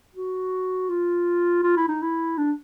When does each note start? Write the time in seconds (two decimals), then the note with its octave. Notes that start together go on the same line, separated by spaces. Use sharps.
0.15 F#4
0.89 F4
1.63 F4
1.77 E4
1.88 D#4
2.02 E4
2.37 D4